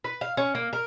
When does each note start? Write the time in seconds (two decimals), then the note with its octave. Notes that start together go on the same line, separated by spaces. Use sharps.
0.04 B4
0.21 F5
0.37 C#4
0.55 A#3
0.73 A#4